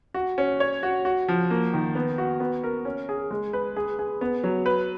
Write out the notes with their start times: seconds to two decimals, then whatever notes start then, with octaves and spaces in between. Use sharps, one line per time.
0.14 F#4
0.38 C#4
0.60 C#5
0.83 F#4
1.05 F#4
1.28 F3
1.50 A#3
1.73 D#3
1.95 B3
2.18 F#4
2.40 B3
2.64 A#4
2.85 C#4
3.09 G#4
3.31 G#3
3.53 B4
3.76 G#4
3.99 G#4
4.21 B3
4.44 F#3
4.66 B4